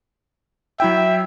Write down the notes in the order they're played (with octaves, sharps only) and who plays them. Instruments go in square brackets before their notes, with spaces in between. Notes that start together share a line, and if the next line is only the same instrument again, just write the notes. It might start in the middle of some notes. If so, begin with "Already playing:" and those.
[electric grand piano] F#3 E4 G5 [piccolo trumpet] E5